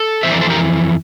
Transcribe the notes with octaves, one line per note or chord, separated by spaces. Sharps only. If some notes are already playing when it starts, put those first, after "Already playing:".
Already playing: A4
F2 E3 C5 E5
A#4 D5
A4 C5
G4 A#4